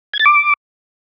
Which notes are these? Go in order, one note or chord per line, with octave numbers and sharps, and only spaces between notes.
G#6
A6
D6